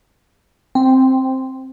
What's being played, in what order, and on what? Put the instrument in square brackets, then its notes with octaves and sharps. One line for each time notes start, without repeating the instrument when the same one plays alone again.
[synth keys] C4